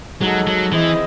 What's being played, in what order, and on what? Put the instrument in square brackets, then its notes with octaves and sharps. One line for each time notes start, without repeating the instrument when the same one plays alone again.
[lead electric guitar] F#3 [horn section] G#3 D#4 F#4 A4 D#5
[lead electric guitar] F#3
[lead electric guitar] E3 [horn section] C4 E4 G#4 D#5